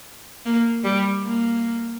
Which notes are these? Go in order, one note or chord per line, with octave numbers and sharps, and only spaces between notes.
A#3
G3
A#3